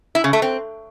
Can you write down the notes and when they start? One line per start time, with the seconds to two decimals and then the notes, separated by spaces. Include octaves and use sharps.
0.15 E4
0.24 C#3
0.33 A3
0.42 C4